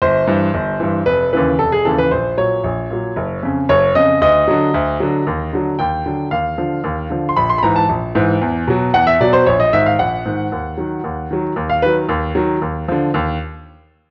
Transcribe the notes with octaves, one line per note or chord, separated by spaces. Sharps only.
G1 C5
G2 E3
G1
G2 E3
F1 B4
D#2 C#3 E3 B4
F1 A4
G#4
D#2 C#3 E3 A4
B4
A#1 C5
A#2 F#3 C#5
A#1
A#2 F#3
F#1
F2 C#3
F#1 C#5
F2 C#3 D#5
D2 D#5
D3 F#3
D2
D3 F#3
D#2
D3 F#3
D#2 G5
D3 F#3
D#2 F5
D3 F3
D#2
D3 F3
C6
A#1 B5
C6
B5
G#2 E3 A#5
A5
A#1
G#2 E3
E2
B2 F#3
E2 F#5
E5
B2 F#3 D5
C5
A#1 C#5
D#5
G#2 D#3 E5
F5
A#1 F#5
G#2 D#3
D#2
D#3 F#3
D#2
D#3 F#3
D#2
F5
D#3 F#3 B4
D#2
D#3 F#3
D#2
D3 F3
D#2